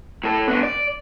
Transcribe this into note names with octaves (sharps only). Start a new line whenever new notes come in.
A2 A4
B3 D4
D5